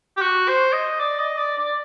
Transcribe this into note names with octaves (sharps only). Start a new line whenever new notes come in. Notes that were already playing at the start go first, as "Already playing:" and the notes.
G4
F#4
C5
D#5
D5
D#5
D5
D5